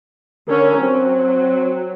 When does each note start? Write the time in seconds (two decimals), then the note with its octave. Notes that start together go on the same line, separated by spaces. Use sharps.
0.48 D3 C#4 A#4
0.78 F#3 C4